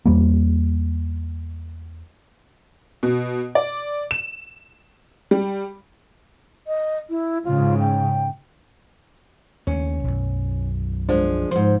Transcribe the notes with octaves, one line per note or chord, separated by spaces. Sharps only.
E2 G3 A#3
B2
D5
E7
G3
D#5
E4
G#2 C#3 F4
G5
D#2 A3 C#4
B1 F#2
F3 G#3 D4
G#2 F3 C5